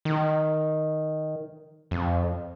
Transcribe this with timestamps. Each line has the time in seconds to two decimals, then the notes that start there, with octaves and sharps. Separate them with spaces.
0.05 D#3
1.91 F2